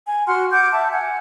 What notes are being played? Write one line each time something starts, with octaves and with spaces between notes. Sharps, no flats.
G#5
F#4 F#5 C6 F6
F#5 D6 G6
E5 A5
F#5 G#5